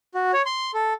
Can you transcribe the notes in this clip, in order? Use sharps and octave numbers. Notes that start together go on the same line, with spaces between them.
F#4
C#5
C6
A4